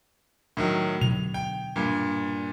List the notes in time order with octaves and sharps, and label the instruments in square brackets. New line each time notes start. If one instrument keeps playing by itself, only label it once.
[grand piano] A2 D#3 F#3
[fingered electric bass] B2 D3 F#3 [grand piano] F7
[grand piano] G5
G2 A#2